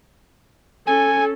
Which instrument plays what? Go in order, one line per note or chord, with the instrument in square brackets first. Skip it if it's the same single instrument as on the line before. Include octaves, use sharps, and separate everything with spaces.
[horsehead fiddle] C#4 A4 [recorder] G#5